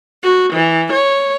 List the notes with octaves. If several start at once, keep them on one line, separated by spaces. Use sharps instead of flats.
F#4
E3
C#5